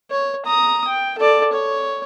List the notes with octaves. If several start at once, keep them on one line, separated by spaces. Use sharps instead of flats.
C#5
A#5 D#6
G5
A4 D5
C#5